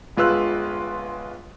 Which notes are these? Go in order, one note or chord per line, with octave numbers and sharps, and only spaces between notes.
G1 G#3 F4 B4 E6 F#6